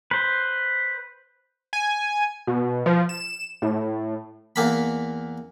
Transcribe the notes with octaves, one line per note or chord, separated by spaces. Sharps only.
B4 C5
G#5
B2
F3
E7
A2
E2 A#3 B5